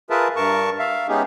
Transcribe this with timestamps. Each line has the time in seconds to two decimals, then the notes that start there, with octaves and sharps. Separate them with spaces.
0.10 F4 G#4 A#4 B4 E5 A5
0.36 G2 A#4 A5 C#6
0.79 E5 F5
1.09 G#3 B3 C#4 D#4 G4 G#4